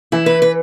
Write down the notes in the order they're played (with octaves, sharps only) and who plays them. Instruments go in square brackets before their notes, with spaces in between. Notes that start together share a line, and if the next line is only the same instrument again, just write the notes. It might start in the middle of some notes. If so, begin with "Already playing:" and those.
[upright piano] E3 [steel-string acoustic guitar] E4
[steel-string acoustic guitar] B4
B4